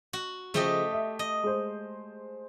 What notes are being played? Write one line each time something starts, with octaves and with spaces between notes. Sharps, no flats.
F#4
C#3 F3 A3 G4 D#5 G7
E5
D#5
G#3 C5